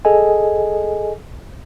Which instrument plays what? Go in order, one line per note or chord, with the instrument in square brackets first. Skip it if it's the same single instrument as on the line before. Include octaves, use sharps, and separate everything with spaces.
[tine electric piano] G#4 A4 D#5 G#5